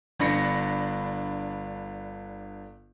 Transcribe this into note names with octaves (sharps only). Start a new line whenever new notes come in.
G1 D4 B5 A#6 C#7